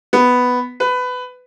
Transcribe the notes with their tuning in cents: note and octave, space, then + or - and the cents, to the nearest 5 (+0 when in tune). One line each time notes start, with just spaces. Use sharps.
B3 +5
B4 +20